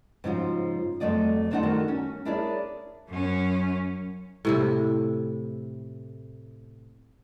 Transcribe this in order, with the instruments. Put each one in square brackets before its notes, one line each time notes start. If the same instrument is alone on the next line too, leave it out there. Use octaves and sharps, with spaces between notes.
[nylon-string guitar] G#2 C#3 F3 C#4 F4 F#4
F2 B2 F#3 A3 D5 D#5
G#3 A3 C4 D4 D#4 F#5
D#3 F#4 A4
C#4
D4 E4 G#4 A#4 C#5 D5
[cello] F#2 C#4
[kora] A2 C3 E4